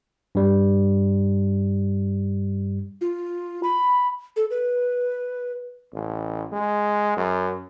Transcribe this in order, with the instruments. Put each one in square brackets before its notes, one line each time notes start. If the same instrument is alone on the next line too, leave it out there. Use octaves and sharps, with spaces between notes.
[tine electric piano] G2 G3
[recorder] F4
B5
A4
B4
[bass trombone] A1
G#3
F#2